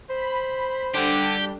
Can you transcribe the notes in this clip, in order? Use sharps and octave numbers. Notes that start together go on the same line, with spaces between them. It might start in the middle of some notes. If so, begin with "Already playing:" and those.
C5 B5
D3 G3 D4 G4